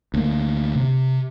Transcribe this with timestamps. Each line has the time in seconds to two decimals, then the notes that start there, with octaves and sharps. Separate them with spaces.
0.14 D2 A#3
0.75 C3